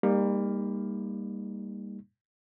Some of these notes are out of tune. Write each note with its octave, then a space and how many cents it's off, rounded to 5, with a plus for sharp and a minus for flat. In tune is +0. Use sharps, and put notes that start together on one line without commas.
G3 +30 A#3 +0 D#4 +0